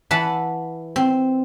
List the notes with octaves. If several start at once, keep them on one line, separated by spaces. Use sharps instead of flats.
E3 F#5 A5 B5
C4